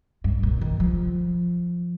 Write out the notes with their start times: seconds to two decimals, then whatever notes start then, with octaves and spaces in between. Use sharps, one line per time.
0.24 G2
0.43 A#2
0.61 D#3
0.80 F3